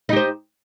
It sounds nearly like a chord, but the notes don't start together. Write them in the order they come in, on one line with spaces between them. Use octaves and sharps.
D#4 G4 C5